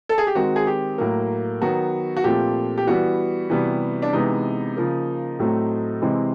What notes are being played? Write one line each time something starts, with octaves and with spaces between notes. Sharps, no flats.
A4
G#4
G4
D#3 G#3 C4 F#4
G#4
G4
A2 F#3 A#3
D#3 F#3 B3 F#4
F#4
A#2 F3 A3 C4 G4
G4
E3 G3 B3 F#4
C3 E3 G3 B3
D4
C3 E3 G#3 B3 D#4
C#3 F3 A#3
A2 F#3 A3 C4
C3 E3 G#3 C4